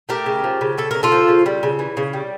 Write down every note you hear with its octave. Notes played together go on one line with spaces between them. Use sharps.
A3 G4 A#4
C#3
F3
C#3
A3 A4
C#3 A#4
F4 A4
F3
C#3
G3
C#3
E3
C#3
G3